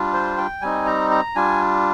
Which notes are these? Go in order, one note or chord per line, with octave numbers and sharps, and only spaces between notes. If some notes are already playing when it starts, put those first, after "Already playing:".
Already playing: G3 D4 F4
C5
G5
G3 C4 D#4 G#5
A#5
A#5
G3 D4 F4 G#5